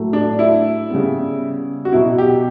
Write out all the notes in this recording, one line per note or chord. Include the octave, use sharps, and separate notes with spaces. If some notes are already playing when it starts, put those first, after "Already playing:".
Already playing: A2 F#3 A3
D4
E4
C#3 G3 B3
F#4
B2 F#3 B3 E4
G4